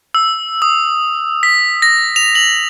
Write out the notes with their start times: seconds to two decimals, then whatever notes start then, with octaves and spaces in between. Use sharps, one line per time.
0.15 E6
0.62 D#6
1.43 B6
1.82 A#6
2.16 F7
2.35 F#7